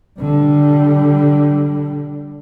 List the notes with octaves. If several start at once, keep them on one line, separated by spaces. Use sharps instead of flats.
D3 G3